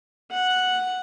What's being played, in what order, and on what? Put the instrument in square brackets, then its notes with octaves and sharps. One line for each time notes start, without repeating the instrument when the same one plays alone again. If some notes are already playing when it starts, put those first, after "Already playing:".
[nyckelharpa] F#5